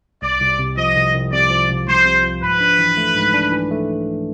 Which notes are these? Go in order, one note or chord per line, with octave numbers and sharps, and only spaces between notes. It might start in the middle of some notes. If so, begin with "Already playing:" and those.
C2 D5
C2
C3
F3 D#5
C2
C2
C3 D5
F3
C2
C2 C5
C3
F3
G#2 B4
D4
E3
A3
G#2
D4
E3
A3